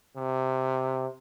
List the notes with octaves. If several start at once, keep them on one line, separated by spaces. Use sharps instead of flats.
C3